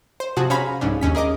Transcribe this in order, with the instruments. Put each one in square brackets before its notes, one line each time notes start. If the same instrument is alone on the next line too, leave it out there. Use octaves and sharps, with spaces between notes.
[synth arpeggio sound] C5
C3 F3 F#4 G#4 A5
C#4 C5 F5 G#5 A#5 B5
C2 G#2 F3 C#4 D4
D#2 C#4 B6
G#4 A#4 D#5 D6